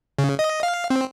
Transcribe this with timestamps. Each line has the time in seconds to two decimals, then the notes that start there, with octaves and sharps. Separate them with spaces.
0.19 C#3
0.39 D#5
0.63 F5
0.90 C4